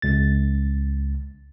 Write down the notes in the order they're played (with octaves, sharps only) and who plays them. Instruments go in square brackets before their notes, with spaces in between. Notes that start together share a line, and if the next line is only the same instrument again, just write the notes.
[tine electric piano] C#2 A6